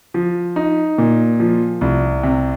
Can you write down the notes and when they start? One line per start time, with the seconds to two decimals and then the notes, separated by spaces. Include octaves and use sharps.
0.14 F3
0.56 D#4
0.98 A#2
1.40 F3
1.81 C2
2.23 C3